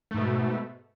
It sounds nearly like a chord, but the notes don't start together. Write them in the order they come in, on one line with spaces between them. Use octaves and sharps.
A3 G#2 B2